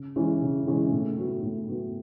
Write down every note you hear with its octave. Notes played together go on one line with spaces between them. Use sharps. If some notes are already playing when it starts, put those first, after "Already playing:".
Already playing: C#3
E3 G#3 C#4 E4
C#3
E3 G#3 C#4 E4
A2
F#3 B3 F#4
A2
F#3 B3 F#4